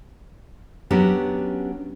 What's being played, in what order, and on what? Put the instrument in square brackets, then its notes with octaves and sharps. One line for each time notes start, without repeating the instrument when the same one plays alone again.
[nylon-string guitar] F#3 B3 C#4 D4 G4